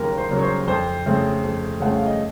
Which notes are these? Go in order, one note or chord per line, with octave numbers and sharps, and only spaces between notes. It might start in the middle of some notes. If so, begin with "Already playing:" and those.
Already playing: D#2 C#3 F#3 A#3 A#4
C5
C#3 F#3 A#3
C#5
C5
F2 C5
C#3 A3 C4
F2
C#3 A3 C4 F#5
F5
D#5